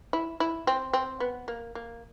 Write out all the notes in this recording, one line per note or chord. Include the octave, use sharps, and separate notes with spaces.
E4
E4
C4
C4
B3
A#3
A#3